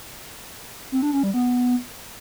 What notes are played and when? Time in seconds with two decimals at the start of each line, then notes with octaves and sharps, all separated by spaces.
0.92 C4
1.02 D4
1.13 C#4
1.23 G3
1.34 B3